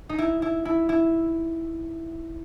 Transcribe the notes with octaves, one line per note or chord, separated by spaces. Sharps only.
D#4
E4
E4
E4
E4